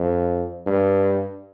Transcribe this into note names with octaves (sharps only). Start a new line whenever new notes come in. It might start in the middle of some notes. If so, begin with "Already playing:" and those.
Already playing: F2
G2